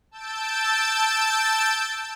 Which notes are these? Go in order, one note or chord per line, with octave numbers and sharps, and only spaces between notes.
A5 E6 G6 A6 D7